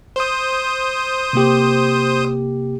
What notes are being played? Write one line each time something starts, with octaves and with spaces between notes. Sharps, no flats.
C5 D#6
C3 A#3 G4